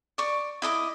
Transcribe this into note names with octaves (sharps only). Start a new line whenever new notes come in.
D5 C#6
E4 D#5 A5 D6